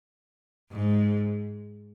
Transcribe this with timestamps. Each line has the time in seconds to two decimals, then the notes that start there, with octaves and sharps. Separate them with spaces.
0.71 G#2